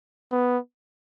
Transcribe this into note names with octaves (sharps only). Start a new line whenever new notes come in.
B3